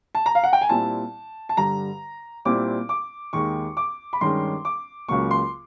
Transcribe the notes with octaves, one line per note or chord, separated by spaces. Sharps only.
A5
A#5
F5
F#5
G5
G#5
A#2 G3 C4 E4 A5
A5
G2 D3 G3 A#5
A#2 G3 C4 E4 D6
D6
D#2 D#3 G#3 C#6
D6
B5
G2 D#3 G#3 C#4 C6
D6
C#2 C#3 F#3 A#3 C#6
C6